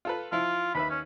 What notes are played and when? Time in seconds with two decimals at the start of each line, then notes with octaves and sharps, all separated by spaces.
0.05 F4 A4 B4
0.32 F3 E4 F4
0.75 D#2 B4 E5 B5
0.90 C#4